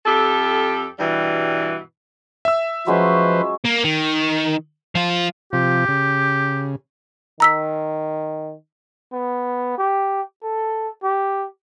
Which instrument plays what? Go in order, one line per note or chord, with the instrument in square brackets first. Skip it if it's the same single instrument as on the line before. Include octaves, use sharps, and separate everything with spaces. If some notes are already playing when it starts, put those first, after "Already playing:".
[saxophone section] F2 G4 A4
G2 B2 E3 G3
[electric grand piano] E5 E6
[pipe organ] F3 B4 C5 [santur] F#3 G#3 C#4
[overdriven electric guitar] A#3
D#3
F3 F4
[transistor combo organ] C3 F3 F4 [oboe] G4
[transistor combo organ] C#3
[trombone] D#3 [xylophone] A#5 E6 B6
[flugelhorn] B3
G4
A4
G4